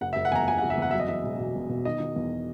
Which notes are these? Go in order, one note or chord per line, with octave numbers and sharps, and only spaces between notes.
F#1 F#5
E5
F#1
F#5
E2 G#5 A#5
F#1 G#5
F#5
F#1
E5
E2 F#5
F#3 E5
D#5
E2 E5
E1
E1
B2
B2
D#3 D#5
D#3
E2